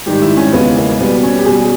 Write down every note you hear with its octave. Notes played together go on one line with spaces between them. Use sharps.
G#2 D#3 G3 G4
E4
C#4
E2 C#3 G#3 B3
A#3
B2 G3 B3
C#4
G4
B2 G3 G#4